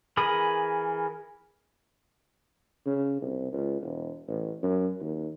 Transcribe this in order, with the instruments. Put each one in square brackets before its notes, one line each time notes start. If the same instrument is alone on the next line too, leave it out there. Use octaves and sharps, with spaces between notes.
[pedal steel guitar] E3 G#4 A#4 B5 D#6
[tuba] C#3
C2
C#2
E1
A1
F#2
D#2